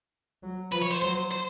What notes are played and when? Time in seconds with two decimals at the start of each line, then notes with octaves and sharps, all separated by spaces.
0.43 F#3
0.72 F3 B4
0.82 C#5
0.92 C5
1.02 F#3 C5
1.32 C5